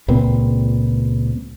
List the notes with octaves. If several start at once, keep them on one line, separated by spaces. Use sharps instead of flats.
C#2 A#2 B3 C4